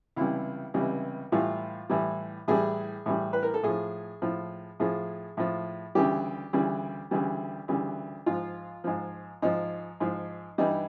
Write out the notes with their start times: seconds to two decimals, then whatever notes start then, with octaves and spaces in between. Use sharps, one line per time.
0.16 C#2 C3 E3 G3 E4
0.74 C#2 C3 E3 G3
1.32 A2 E3 G3 F4
1.90 A2 E3 G3
2.48 A2 E3 G3 G#4
3.06 A2 E3 G3
3.33 B4
3.43 A#4
3.54 A4
3.63 A2 F3 G#4
4.22 A2 F3
4.80 A2 F3 G#4
5.37 A2 F3
5.95 D2 C#3 E3 G3 G4
6.53 D2 C#3 E3 G3
7.11 D2 C#3 E3 G3
7.68 D2 C#3 E3 G3
8.26 G#2 F3 F4
8.84 G#2 F3
9.42 G#2 F3 D#4
10.00 G#2 F3
10.58 G2 E3 G3 D#4